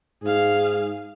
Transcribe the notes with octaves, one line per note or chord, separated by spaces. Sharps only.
G#2 G#4 F5